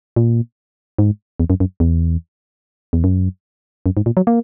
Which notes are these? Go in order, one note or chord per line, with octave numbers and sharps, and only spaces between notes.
A#2
G#2
E2
F#2
F#2
E2
E2
F#2
F#2
G#2
A#2
F#3
A#3